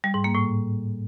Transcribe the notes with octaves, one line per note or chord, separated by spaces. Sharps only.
G3
G#2
A#3
A2